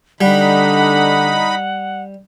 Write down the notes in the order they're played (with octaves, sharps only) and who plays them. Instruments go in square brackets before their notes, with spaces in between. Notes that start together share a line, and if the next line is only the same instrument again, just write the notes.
[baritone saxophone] D3 [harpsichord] G3 [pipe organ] D#4 B5 [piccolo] F#5